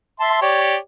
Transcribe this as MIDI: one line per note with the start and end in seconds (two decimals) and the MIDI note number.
0.20 0.39 76
0.20 0.39 81
0.20 0.39 84
0.42 0.76 67
0.42 0.76 73
0.42 0.76 74